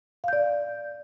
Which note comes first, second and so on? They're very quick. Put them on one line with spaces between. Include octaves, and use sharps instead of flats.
F5 G6 D5